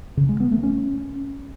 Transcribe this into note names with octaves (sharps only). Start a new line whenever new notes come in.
C#3
G#3
B3
A3
C#4